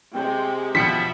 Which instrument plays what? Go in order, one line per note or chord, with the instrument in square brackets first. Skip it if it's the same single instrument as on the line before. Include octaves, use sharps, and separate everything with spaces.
[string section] C3 G#3 [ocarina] G5
[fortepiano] B2 F3 [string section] E5 B5 [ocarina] G5 [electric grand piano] B6 C#7